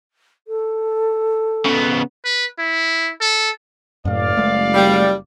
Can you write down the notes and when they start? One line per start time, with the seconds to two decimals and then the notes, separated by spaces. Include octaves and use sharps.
0.48 A4
1.65 C#3 B3
2.25 B4
2.59 E4
3.21 A4
4.05 F#1 F#2 A2 D5 F5
4.37 G#3 A3
4.74 G3